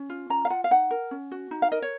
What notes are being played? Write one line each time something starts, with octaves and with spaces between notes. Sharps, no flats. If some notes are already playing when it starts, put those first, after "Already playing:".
Already playing: C#4
F4
C#4 A#5
F5
F4 F#5
F5
D#4 F#5
A#4
C#4
F#4
D#4
F5
A#4 D#5
C#5